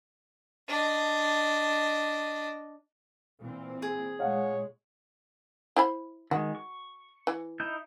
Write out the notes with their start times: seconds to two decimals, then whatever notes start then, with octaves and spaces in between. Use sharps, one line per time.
0.69 D4 D#5
3.40 A#2 E3 C4
3.82 G#4
4.20 A#2 G#3 C#5 F5 F#5
5.76 E4 C5 B5
6.31 D#3 G#3 F#4
6.55 C#6
7.27 E3
7.60 D#4 E4 G6